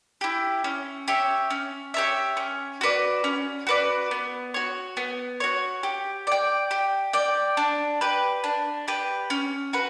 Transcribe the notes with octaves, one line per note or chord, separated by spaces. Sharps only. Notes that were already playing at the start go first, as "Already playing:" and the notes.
E4 G4
C#4
G4 C#5 E5
C#4
G4 C#5 E5
C#4
F#4 B4 D5
C#4
F#4 B4 D5
B3
F#4 C#5
B3
F#4 C#5
G4
D5 G5
G4
D5 G5
D4
G4 B4
D4
G4 B4
C#4
F#4 B4